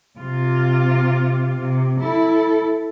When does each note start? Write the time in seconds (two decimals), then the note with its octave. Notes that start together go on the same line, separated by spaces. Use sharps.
0.19 C3 F4
1.59 C3
2.00 E4 A4